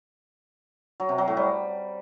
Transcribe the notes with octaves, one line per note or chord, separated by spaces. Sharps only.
F#3
C3
F#3
A2
G3